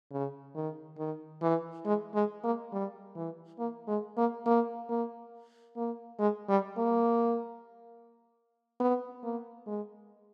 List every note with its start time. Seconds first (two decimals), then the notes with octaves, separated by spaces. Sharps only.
0.12 C#3
0.55 D#3
0.98 D#3
1.42 E3
1.86 G#3
2.14 G#3
2.44 A#3
2.72 G3
3.15 E3
3.59 A#3
3.88 G#3
4.17 A#3
4.46 A#3
4.89 A#3
5.76 A#3
6.20 G#3
6.49 G3
6.78 A#3
8.80 B3
9.23 A#3
9.67 G#3